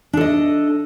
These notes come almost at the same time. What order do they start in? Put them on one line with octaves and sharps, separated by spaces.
D4 A4 D#5